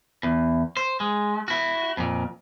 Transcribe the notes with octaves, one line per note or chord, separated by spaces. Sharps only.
E2
C5
G#3
E4 F#4
F2 A#2